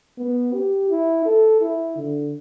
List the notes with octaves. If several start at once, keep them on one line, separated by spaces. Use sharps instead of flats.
B3
G4
E4
A4
E4
D3